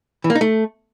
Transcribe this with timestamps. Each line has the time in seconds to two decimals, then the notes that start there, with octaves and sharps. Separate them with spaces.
0.24 E3
0.30 A#3
0.35 D#4
0.41 A3